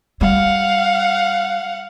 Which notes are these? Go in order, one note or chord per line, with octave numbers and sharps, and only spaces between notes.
G3 F5 F#5